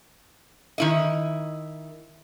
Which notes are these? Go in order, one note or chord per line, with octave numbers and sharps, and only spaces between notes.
D#3 E4 D#5